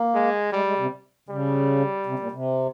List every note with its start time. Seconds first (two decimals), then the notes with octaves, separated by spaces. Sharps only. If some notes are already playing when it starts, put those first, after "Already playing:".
Already playing: A#3
0.14 G#3
0.52 G3 G#3
0.65 G#3
0.78 C3
1.29 C#3 G3
2.06 C3
2.19 A#2
2.32 C3